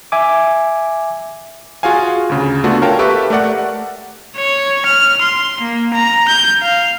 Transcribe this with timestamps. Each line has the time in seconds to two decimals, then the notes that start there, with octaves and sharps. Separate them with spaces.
0.12 E5 G#5 D6
1.83 F4 F#4 G#4 F5 G#5
2.29 D2 C#3
2.64 A3 B3 D4 F4 F#4
2.82 A#4 C#5 F5 G5 A5
2.99 G4 A4 B4 E5 C#6
3.30 A3 A#4 D5 F#5
4.36 C#5
4.86 F6
5.21 C6
5.61 A#3
5.93 A#5
6.28 G6
6.62 F5